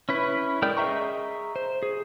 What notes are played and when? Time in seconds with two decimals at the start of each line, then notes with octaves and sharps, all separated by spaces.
0.09 C#4 E4 B4
0.62 G#3 A#4 D5 G5 G6
0.77 G#4 D#5 E5 A#5 C#6
1.56 C5
1.83 G#4